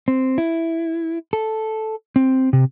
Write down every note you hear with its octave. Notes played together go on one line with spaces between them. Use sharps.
C4
E4
A4
C4
C3